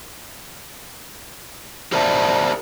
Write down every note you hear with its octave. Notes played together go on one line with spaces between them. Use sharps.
G4 A#4 C5 D5 E5 A5